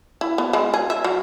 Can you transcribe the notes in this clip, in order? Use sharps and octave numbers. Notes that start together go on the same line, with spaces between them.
E4
B3
G#3
G#4
E5
F#3